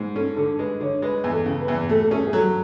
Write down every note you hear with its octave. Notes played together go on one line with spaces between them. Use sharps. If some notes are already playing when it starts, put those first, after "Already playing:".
Already playing: G#2
C#4 A4
D3 A4
G#3 B4
D3 C#5
G#3 B4
E2
A4
C#3
B4
E2
A3 A4
A4
C#4 G#4
G#4
F#3 A4